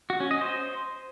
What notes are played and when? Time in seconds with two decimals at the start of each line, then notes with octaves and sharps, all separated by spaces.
0.10 F#4
0.20 C#4
0.31 D#5
0.41 C5